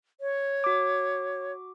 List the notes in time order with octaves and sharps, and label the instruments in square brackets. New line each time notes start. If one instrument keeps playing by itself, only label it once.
[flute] C#5
[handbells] F#4 D6